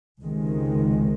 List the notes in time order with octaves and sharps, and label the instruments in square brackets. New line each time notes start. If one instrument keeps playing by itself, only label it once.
[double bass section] C#2 C3 D#3 G#3